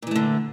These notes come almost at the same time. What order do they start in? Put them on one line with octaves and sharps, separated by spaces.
A#2 E3 A3 D3